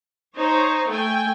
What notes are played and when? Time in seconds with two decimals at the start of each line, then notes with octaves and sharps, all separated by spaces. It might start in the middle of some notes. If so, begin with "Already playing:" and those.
0.36 D#4 C5 C#5
0.89 A3 G5 G#5